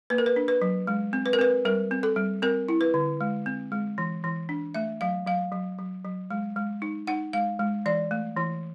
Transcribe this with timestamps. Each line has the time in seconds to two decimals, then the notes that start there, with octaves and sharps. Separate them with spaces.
0.10 A#3 B4
0.18 A#4
0.26 B4
0.36 D4
0.48 B4
0.62 F#3
0.87 G#3
1.13 C4
1.26 B4
1.33 A#4
1.39 C4 B4
1.65 G3 A#4
1.91 C4
2.03 A4
2.16 G3
2.42 C4 A#4
2.69 E4
2.81 B4
2.94 D3
3.21 G#3
3.46 C4
3.72 G#3
3.98 E3
4.24 E3
4.49 D4
4.75 A3 E5
5.01 F#3 F5
5.27 F#3 F5
5.52 F#3
5.78 F#3
6.05 F#3
6.31 G#3
6.56 G#3
6.82 D#4
7.07 D#4 F#5
7.33 G#3 F5
7.59 G#3
7.86 E3 D5
8.11 A3
8.37 E3